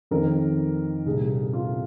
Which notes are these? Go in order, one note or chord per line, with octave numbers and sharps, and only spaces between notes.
F2 D#3 A#4
C2 A#2 G#4
F4